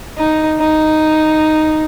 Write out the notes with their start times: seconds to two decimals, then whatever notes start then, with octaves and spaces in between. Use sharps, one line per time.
0.17 D#4
0.59 D#4